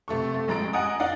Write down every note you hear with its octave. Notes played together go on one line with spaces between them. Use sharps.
C3 A3 A4 C#6
A3
A1 G#3 A#5 A6 D7
D#5 F#5 G#5 A#5 D#6
D#4 D5 D#5 F5 F#5